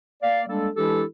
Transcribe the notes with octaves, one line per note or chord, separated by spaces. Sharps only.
A#3 D5 F5
G3 G#3 A#3 D4 A4
E3 G#3 D4 E4 G4 A4